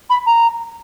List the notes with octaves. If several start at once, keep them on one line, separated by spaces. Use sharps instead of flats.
B5
A#5